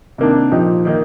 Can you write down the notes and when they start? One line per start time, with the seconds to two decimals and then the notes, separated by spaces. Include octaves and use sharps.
0.18 C3 D#3 A#3 D4
0.52 A#2 F3 A#3 D#4 G4
0.85 D#3 A#3 D#4